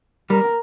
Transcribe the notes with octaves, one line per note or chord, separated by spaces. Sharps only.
G3 A#4